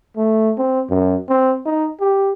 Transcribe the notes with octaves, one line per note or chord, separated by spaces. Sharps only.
A3
C4
F#2
C4
D#4
G4